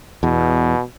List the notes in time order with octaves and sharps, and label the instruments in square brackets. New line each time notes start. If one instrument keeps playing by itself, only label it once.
[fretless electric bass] E2 [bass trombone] B2